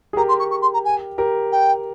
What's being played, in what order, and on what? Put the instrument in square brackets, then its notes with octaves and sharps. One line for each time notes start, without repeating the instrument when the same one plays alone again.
[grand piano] G#4
[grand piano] G4 A#4 [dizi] A#5
[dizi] C6
C#6
C#6
C6
A#5
G#5
[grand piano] G4 A#4
[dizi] G5